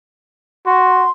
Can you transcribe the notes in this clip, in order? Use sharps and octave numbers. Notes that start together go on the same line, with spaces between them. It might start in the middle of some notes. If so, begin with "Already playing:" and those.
F#4 C6